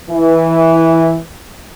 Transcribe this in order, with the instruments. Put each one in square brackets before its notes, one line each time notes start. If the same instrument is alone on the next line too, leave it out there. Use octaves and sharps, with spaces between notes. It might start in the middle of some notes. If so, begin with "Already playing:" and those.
[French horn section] E3